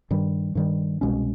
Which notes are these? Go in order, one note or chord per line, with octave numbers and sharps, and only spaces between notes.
G2 D#3 G3
G2 D#3 G3
C2 B2 G#3 C#4